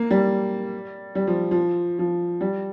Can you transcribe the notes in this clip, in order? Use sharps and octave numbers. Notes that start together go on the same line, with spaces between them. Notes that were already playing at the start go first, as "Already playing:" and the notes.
Already playing: A#3
G3
G3
F3
F3
F3
G3